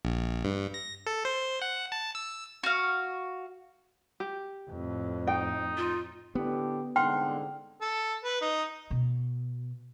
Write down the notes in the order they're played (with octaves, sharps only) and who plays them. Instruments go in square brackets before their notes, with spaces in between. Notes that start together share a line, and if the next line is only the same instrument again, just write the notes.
[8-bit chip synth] A#1
G2
A#6
A4
C5
F#5
A5
E6
[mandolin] F#4 F5
[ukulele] G4
[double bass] F2 A2
[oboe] D#4 [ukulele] G5
[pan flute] F4
[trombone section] A2 D3 G4 [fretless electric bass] B3
[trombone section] C2 G#2 D3 [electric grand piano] F#5 C6 F6 [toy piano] G5
[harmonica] A4
B4
D#4
[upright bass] B2